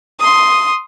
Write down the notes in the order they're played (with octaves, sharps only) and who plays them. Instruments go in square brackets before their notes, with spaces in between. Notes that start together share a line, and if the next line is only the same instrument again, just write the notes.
[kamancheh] C6 D#6